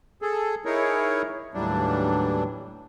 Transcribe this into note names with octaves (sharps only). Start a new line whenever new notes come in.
G#4 A4
D#4 E4 G#4 A#4 C#5
D#2 A2 E3 F#3 G3 D4